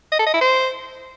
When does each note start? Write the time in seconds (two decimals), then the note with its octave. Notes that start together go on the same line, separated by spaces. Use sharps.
0.12 D#5
0.19 A4
0.27 D#5
0.34 E4
0.41 C5